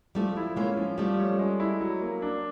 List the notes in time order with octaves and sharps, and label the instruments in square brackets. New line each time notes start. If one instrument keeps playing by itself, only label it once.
[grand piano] F3 [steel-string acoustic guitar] G3 A3
[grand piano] E4
[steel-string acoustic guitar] G#3 A#3 [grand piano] C#4
[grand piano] F3
[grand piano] F3 [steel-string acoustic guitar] G3 A3
[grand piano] C#4
G#3
E4
F#3
A#3
D4